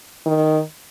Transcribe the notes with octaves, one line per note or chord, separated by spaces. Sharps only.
D#3